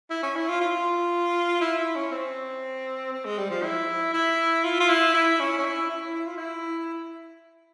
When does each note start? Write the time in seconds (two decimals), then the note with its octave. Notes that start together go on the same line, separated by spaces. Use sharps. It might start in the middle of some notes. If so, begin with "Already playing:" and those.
0.10 E4
0.23 C#4
0.36 E4
0.49 F4
0.61 F4
1.61 E4
1.79 E4
1.95 C#4
2.12 C4
3.13 C4
3.25 G#3
3.38 G3
3.50 F3
3.63 E4
4.14 E4
4.64 F4
4.80 F4
4.89 E4
5.14 E4
5.40 C#4
5.59 C#4
5.65 E4
5.90 E4
6.15 E4
6.27 F4
6.37 E4